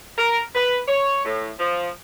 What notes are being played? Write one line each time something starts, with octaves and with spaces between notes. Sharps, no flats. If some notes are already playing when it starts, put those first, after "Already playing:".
A#4
B4
C#5
A2
F3